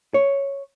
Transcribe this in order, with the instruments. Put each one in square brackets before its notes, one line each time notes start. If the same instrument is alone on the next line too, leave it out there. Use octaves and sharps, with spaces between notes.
[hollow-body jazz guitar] C#5